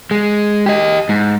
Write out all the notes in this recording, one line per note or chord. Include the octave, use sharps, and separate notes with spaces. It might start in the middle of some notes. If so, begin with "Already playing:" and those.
G#3
G4 D#5
G#2